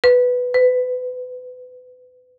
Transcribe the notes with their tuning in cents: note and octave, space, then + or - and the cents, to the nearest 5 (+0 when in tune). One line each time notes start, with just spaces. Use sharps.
B4 +5
B4 +30